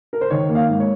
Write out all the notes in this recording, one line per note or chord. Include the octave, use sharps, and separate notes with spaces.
A#4
C5
D#3 C#5
A#3
F5
G#2
C#5